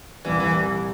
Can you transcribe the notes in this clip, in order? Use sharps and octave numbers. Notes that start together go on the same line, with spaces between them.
C2 A#2 E3 G3
E3